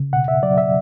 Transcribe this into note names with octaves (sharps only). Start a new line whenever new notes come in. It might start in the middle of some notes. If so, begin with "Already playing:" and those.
Already playing: C#3
B2 F#5
E5
F#3 D5
E5